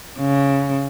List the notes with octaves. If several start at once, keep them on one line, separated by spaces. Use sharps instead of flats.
C#3